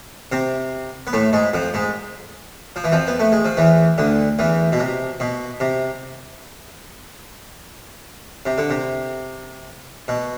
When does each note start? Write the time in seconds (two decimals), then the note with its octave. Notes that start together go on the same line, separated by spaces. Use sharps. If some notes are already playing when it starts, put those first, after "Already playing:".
0.32 C3 C4
1.07 B3
1.13 A2 A3
1.33 G#2 G#3
1.54 F2 F3
1.74 G#2 G#3
2.76 F3
2.84 E3
2.92 F2 F3
3.07 B3
3.20 A3
3.32 G#3
3.45 F3
3.57 E2 E3
3.98 D2 D3
4.39 E2 E3
4.72 B2
4.80 C3
5.20 B2
5.60 C3
8.46 C3
8.58 D3
8.70 C3
10.08 B2